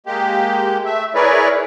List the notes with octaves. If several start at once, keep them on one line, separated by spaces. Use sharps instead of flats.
G#3 A#3 G4
A3 E5
E4 G#4 A#4 B4 C#5 D5